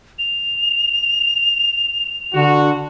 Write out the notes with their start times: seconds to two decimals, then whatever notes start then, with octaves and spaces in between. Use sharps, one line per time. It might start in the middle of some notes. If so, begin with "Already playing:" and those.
0.19 F7
2.34 D3 F#4